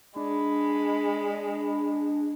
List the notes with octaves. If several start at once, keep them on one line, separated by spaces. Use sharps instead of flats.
G#3 D4 B5